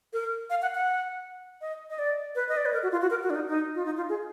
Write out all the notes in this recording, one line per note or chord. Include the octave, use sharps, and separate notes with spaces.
A#4
F5
F#5
F#5
D#5
D#5
D5
B4
D#5
D5
B4
A#4
F#4
F4
F#4
A#4
F#4
D4
D#4
D#4
F4
D#4
F4
G#4